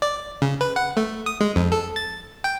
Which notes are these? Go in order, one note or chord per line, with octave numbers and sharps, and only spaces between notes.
D5
C#3
B4
F#5
A3
D#6
G#3
F2
A4
A6
G5